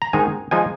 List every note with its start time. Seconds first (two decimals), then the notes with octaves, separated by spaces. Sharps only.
0.02 A#5
0.13 G#2 D#3 G#3 D#4 G#5
0.51 F3 G#3 D#4 G#5